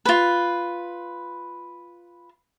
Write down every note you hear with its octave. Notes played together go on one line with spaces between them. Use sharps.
F4 B4